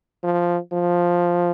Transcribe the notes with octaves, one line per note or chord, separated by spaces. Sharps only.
F3
F3